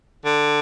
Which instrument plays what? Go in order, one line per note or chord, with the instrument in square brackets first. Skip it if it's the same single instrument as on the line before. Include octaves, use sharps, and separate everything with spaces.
[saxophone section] D3